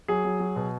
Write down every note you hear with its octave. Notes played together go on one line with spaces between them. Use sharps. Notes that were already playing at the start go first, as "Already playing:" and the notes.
F#3 G#4
F#3
F#3
B2